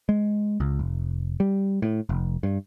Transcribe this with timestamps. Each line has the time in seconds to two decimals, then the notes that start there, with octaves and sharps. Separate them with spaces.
0.09 G#3
0.60 C#2
0.79 F1
1.40 G3
1.82 A2
2.09 F1
2.43 G2